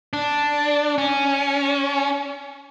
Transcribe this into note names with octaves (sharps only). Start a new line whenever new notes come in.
D4
C#4